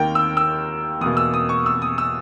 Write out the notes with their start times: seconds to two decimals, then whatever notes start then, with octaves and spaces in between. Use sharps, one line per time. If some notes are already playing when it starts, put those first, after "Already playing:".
Already playing: D#2 D#3 A#3 A#4 G5
0.15 E6
0.37 E6
1.01 E2 B2 A#3 D#6
1.17 E6
1.34 D#6
1.49 C#6
1.66 E6
1.82 D#6
1.98 E6